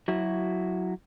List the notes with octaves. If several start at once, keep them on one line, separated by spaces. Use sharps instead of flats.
F#3 E4 F#4